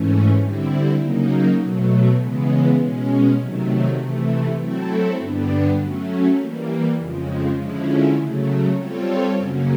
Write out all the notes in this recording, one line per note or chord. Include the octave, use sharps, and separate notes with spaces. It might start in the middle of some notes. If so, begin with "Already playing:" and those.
Already playing: G#2 E3 A3 C#4
D3 G3 C4 E4
C#3 F#3 A#3 D#4
B2 F#3 A3
C#3 E3 G#3 B3
B2 G#3 C#4
C3 D#3 F#3 A3
C3 E3 A3
F#3 A3 C4 E4 A4
G2 D3 G3 B3 D4
F#3 A3 C#4
E3 G3 A#3
F2 C#3 F3 G#3
D3 F3 G#3 C#4 E4
C#3 F#3 A3
G3 C4 F4 A4 C#5
F#2 C#3 F#3 A#3 C#4